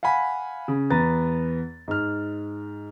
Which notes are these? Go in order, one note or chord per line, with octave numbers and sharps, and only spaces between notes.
F5 F#5 G#5 B5
C#3
E2 B3 A#5 A6
G#2 F6